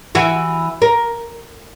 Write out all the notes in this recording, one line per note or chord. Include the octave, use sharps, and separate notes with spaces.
E3 E4 F#4
A#4